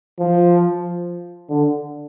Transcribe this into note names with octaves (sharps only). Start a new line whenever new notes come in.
F3
D3